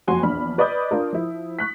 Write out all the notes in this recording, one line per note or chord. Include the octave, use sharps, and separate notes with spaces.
F#1 F2 F#4 G#5 C6
A#1 E2 D4 B5 F6
B4 D5 D#5 B5 D#6 G6
D4 F4 A#4
F3 E4
C#6 F#6 B6